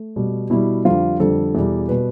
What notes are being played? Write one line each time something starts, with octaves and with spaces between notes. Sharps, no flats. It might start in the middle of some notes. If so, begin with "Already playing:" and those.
Already playing: A3
B2 G3
B2 G3 E4
F2 D3 G3 F4
F2 D3 G3 A4
E2 B2 G3
B2 G3 B4